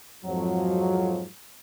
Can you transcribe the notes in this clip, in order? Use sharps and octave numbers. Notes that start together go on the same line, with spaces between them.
F2 G#2 F3 F#3